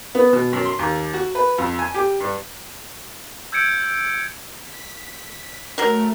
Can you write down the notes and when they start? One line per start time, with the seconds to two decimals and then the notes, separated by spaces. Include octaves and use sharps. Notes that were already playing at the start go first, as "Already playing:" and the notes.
0.15 B3
0.33 B2
0.53 F#2
0.65 C6
0.79 D#2
1.14 F#4
1.35 B4
1.58 F2
1.79 G#5
1.95 G4
2.20 G2
3.52 E6 G6 G#6 C#7 D7
4.61 B6
5.78 F#3 A3 A#4